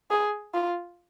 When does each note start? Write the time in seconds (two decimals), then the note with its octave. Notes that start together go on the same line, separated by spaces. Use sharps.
0.11 G#4
0.54 F4